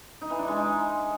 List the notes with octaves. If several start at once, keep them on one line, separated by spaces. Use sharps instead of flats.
D#4
E3
D4
G#3
D#4